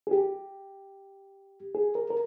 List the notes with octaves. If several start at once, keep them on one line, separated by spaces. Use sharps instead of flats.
G#4
G4
G#4
A#4
A#4